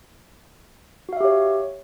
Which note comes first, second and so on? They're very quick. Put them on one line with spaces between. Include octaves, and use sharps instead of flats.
F#4 F5 E5 G4 C#5